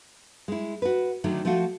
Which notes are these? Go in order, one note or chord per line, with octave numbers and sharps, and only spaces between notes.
G#3 E4
F#4 B4
D3 D#3 F#3 A3 D4 D#4
F3 A3 F4 F#4